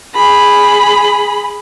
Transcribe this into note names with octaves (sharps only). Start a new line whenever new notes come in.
G#4 B5